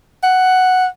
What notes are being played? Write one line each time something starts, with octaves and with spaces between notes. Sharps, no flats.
F#5